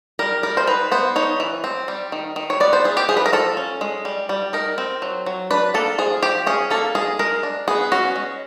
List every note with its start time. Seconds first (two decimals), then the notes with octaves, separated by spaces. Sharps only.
0.19 G3 A#4
0.43 G3 A#4
0.57 C5
0.67 D#4 B4
0.92 B3 C5
1.16 D#4 C#5
1.40 E3
1.64 C4
1.88 G3
2.12 D#3
2.36 D#3
2.50 C#5
2.60 B3 D5
2.73 C5
2.85 G3 G#4
2.97 G4
3.09 F3 G#4
3.17 B4
3.26 A#4
3.33 F3 A4
3.57 C#4
3.81 G#3
4.05 G3
4.29 G3
4.53 D#4 A#4
4.78 C4
5.02 F#3
5.26 F#3
5.51 D4 B4
5.74 A#3 A4
5.98 F3 G#4
6.22 F3 G4
6.47 C#4 G#4
6.70 A#3 A4
6.95 G#3 G#4
7.19 G#3 A#4
7.43 D4
7.68 B3 G#4
7.92 C#4 F#4
8.16 G#3